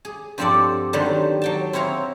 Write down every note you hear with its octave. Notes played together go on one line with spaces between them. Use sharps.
G#4
G2 F3 C4 A4 D5 F#5
D3 D#3 F#3 G3 B3 C5
F#3 G5 A5
C4 E4 C#5 F5 A#5